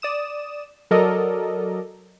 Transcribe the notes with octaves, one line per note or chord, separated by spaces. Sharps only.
D5 D#6 E7
F#3 A4 A#4 D5 D#5